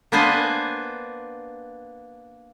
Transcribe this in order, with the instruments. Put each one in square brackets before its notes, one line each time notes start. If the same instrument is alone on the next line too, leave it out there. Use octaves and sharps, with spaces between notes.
[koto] A#3 B3 D4 B4 C5 G#5